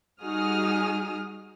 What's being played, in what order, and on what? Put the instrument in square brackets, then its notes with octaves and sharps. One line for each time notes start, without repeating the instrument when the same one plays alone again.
[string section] G3 D#4 F#4 G#4 D#6 F6